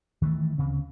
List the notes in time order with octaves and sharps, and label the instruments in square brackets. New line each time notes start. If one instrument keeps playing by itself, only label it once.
[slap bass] D#3 E3 G3 A3
D2 C#3 C4